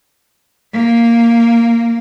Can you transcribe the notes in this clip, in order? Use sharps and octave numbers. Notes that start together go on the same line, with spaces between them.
A#3